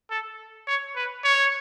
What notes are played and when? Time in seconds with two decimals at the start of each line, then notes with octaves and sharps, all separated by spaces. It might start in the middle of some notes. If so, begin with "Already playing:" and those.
0.11 A4
0.67 C#5
0.96 B4
1.24 C#5